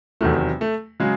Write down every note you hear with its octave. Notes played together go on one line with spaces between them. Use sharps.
E2 C3 D#3 F#3 A3
A3
C#3 F#3 G#3